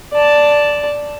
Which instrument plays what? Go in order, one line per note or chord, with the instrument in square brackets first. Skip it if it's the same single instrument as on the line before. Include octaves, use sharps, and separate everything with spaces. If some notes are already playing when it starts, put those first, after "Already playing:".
[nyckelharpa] D5 A5